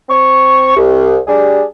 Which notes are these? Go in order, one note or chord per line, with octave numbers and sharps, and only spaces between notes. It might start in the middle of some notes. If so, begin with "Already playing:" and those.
C4 C#6
C2
G3 D4 G#4